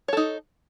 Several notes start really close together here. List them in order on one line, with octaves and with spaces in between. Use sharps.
C#5 A4 D#4